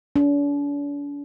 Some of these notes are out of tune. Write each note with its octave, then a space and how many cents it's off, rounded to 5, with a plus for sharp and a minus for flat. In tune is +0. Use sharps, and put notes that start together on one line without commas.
D4 -45